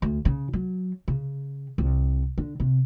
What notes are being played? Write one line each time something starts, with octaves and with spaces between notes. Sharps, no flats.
D2
C#3
F#3
C#3
C2
D3
C3